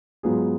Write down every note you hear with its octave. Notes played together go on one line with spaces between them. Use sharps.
G#2 F#3 B3 F4 G#4